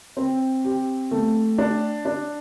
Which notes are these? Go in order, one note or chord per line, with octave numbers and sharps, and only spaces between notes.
C4
G4
A3
D4
D4